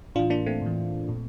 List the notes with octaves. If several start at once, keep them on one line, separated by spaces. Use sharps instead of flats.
A2 E3 D4 F4
A#3 D4
A3 C4
A2 E3
A#2